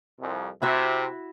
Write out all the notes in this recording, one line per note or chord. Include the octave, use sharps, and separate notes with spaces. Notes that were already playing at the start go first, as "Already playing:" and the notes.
C2 F2
C3 E4 F#4 E5